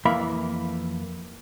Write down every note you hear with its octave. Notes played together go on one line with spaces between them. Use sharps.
F2 E3 A#3 E5 B5